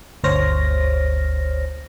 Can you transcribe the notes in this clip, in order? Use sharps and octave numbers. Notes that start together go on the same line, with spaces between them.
G1 D2 C5 C#5 F6 A#6